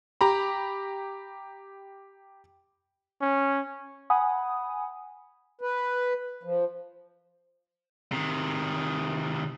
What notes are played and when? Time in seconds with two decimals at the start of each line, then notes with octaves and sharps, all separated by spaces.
0.21 G4 A#5 B5
3.22 C#4
4.10 F#5 G#5 B5 D#6
5.61 B4
6.43 F3
8.12 C3 D#3